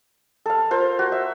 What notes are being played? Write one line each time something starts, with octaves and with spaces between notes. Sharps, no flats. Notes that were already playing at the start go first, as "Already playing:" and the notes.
A4 F5
F4 A#4 C5
F#4
E5